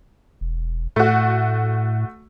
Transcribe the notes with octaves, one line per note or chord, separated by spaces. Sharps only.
E1
A2 A3 F#4